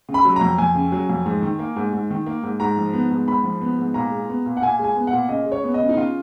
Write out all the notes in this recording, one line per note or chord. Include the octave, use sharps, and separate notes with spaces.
C#3
B5
F#3
A#5
F2
F2 G#5
C#3
F#3
F2
G#2
D#3
A#3
G#2
G#2
D#3
A#3
G#2
G#2 A#5
F3
B3
G#2
G#2 B5
F3
B3
G#2
A#2 A#5
G#3
B3
A#2
F#5
A#2 G#5
G#3
G#5
B3
F#5
A#2
C#3 D#5
G#3
C#5
B3
D#5
C#3
D#4
C#3 F4